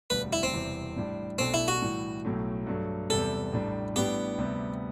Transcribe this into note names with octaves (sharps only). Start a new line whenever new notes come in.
E1 D2 D3 G3 B4
E4
C4
E1 E2 C3 E3 G3
A2 G3 D4
B1 B2 A3 C4 D4
E4
F#4
A2 E3 G3
B1 A2 F#3 A3
G2 F#3 A3
E2 C3 G3 A4
A1 A2 G3 D4
A2 G3 B3 D4 G4
D2 C3 G3 B3